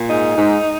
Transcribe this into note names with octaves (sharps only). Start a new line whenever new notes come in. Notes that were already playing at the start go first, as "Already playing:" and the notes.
Already playing: A#2
G#2 D#4
G#2